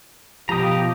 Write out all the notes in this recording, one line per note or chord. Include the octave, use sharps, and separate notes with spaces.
B2 F3 F4 G4 A#5 D#6